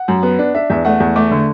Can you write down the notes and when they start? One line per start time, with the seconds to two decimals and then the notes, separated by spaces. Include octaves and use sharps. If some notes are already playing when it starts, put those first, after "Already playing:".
Already playing: F#5
0.08 F#2
0.23 B3
0.39 D4
0.55 D4 E5
0.70 E2 E5
0.85 A3 F#5
1.00 E2
1.16 A3 D6
1.31 D3